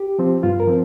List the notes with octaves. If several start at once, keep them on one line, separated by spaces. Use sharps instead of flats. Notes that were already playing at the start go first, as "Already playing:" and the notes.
Already playing: G4
F3 C4
G2 F4
A#4
F3 C4